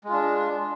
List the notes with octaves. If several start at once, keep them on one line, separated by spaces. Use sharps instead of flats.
G#3 D4 F4